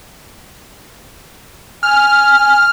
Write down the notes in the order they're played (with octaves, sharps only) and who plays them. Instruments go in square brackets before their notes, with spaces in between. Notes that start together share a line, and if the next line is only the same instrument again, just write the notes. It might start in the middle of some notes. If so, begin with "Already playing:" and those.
[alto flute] G#5 [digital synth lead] F6